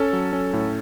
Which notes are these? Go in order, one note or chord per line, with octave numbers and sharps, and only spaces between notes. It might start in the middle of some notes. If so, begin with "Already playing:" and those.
Already playing: C#4 A4
F#3
C#4
A2